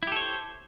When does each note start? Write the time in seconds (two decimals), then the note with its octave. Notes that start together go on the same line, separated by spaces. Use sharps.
0.03 E4
0.07 G4
0.12 A4
0.16 C#5
0.21 C5